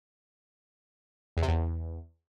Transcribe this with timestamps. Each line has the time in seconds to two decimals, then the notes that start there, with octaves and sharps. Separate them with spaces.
1.37 E2
1.42 C3
1.48 E2